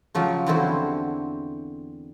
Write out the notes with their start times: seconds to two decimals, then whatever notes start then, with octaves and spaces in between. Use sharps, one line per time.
0.15 C#3 F3 F#3 G4
0.46 E2 D3 C4 E4 F#4 C5